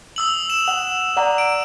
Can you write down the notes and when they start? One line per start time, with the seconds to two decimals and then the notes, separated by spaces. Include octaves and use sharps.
0.16 D#6 E6 F#7
0.50 E7
0.68 F#5
1.17 D5 F#5 A#5
1.38 D7